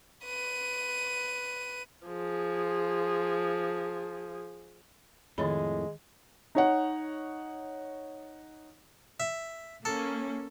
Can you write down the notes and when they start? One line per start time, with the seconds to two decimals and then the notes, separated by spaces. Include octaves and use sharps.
0.25 B4 D#7
2.07 F3 G#4
5.38 F2 A2 D#3 G#3 C#5 B5
6.55 D#4 C#5 F#5
9.20 E5
9.85 A#3 C#4 A4